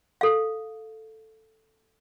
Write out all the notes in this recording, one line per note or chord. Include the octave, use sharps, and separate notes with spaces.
A4 F5